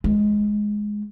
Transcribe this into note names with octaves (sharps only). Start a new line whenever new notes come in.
G#3